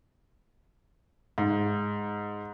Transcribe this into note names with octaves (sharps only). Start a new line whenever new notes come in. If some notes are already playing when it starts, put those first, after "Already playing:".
G#2